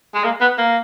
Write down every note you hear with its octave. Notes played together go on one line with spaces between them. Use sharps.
G#3
A#3
B3
A#3